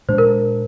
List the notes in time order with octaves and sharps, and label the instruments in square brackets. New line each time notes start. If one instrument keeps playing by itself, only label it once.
[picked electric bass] A#2 G#3 D4 [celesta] C5
[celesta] A#4